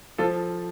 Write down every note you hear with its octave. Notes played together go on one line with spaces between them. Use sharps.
F3 F4 A4